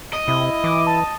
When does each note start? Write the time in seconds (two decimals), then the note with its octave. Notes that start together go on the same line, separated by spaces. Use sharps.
0.13 D#5
0.28 C3 E4 D#6
0.64 E3 D6
0.87 A5